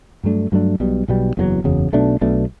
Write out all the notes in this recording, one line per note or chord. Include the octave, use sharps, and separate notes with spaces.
G2 F#3 A3 D4
G2 F#3 A3 D4
B1 B2 G3
B1 B2 G3
F#1 E2 C#3 F#3
F#1 E2 C#3 F#3
B1 B2 A3 D4
B1 B2 A3 D4